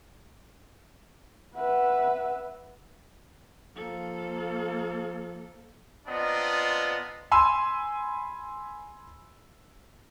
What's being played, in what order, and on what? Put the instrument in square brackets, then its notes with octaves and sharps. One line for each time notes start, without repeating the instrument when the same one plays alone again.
[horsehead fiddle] B4 E5 [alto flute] F#5
[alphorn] F3 [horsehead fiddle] A#3 A4
[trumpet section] B3 C4 D4 F4 D#5 A#5
[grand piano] G#5 B5 C6 E6